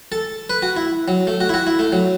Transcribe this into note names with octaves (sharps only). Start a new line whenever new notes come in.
A4
B4
F#4
E4
F#3
A3
F#4
E4
F#4
E4
A3
F#3